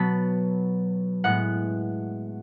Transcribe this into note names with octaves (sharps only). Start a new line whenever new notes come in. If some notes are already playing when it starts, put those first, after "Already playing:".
Already playing: B2 F#3 B3 A5 B5
A2 G#3 B3 F#5